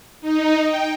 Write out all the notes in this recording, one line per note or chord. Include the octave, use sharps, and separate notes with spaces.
D#4
G5